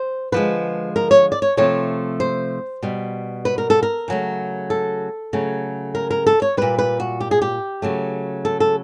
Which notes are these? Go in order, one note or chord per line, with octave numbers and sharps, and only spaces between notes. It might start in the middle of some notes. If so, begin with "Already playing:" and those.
Already playing: C5
D3 F3 G#3 B4
A#4
C#5
D5
C#5
C3 F3 A3 C#5
C5
B2 G3
B4
A#4
A4
A#4
C#3 F#3 A3
A4
C#3 F#3 A3
A#4
A#4
A4
C#5
A#2 G3 B4
B4
F#4
G4
G#4
G4
C#3 F#3 A3
A4
A4